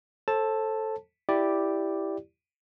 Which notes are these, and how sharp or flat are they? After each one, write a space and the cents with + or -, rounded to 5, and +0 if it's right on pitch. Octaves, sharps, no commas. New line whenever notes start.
A4 +0 C5 +35 A5 +0
E4 +0 G4 +0 D5 +0